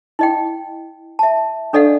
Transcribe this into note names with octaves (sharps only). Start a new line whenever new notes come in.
E4 D#5 G5
E5 A5
D4 A4 D5 D#5 F5 F#5